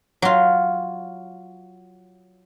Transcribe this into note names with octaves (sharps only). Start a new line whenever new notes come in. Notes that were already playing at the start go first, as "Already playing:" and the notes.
F#3 F4